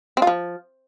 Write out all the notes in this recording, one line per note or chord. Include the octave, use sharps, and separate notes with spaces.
C4
F4
F3